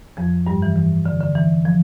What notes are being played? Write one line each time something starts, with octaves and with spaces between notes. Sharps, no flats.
F2 F3
G2 G3
E3
E3
D3
D3
E3
F3